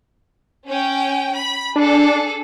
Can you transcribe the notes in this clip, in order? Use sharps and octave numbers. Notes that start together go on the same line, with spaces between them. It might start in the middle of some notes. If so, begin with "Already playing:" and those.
C#4 G5
B5
D4 G#4 A4